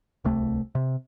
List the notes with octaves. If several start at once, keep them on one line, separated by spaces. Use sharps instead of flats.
D1 C2 A3
C3